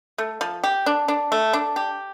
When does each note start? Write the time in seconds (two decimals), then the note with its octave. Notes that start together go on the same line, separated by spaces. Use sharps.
0.18 A3
0.41 F3
0.64 G4
0.86 D4
1.08 D4
1.32 A3
1.53 D4
1.76 G4